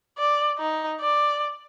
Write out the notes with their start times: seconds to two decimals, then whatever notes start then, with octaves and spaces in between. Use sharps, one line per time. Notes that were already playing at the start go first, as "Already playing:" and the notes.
0.18 D5
0.59 D#4
1.01 D5